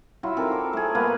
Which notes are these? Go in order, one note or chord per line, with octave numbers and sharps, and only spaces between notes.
F#3 E4 F4
C4 D#4 A4 A#4
D6
A3 G#4
A#3 B3 B4 F5